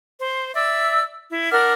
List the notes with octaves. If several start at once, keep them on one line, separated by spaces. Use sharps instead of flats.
C5
D5 E5 E6
E4
D4 A#4 F#5 F6